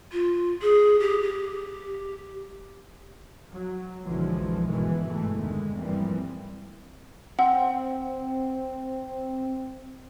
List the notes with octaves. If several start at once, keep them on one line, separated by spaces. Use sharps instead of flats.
F4
G#4
G4
G4
F#3
B1 F2 D3 E3 F3 G#3
G1 G#2 B2 D#3 E3 G#3
G1 G#2 E3 G#3 A3
E2 D3 D#3 G#3
G#2 E3 F3 G3 A#3 C4
C4 F#5